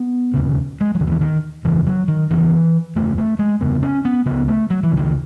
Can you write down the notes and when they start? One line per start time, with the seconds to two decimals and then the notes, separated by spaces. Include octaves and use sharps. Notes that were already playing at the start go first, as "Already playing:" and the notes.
Already playing: B3
0.34 E1 D#2 C#3
0.81 G#3
0.95 F#3
0.99 E1 D#2 C#3
1.07 E3
1.21 D#3
1.64 F#1 E2 C#3 E3
1.87 F#3
2.08 D#3
2.30 F#1 E2 C#3 E3
2.96 F#1 E2 C#3 A3
3.18 A3
3.39 G#3
3.61 F#1 E2 C#3 B3
3.83 C#4
4.05 B3
4.26 C#2 C#3 B3
4.48 A3
4.70 F#3
4.83 E3
4.92 C#2 C#3
4.97 D#3